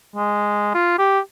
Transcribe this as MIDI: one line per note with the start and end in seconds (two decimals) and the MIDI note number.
0.16 0.74 56
0.74 0.98 65
0.99 1.20 67